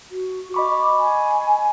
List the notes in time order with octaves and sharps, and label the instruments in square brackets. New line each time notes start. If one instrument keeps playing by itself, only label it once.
[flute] F#4
[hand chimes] D#5 B5 C#6 [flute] D6
[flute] G#5